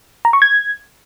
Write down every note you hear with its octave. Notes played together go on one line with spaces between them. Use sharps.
A#5
C#6
G#6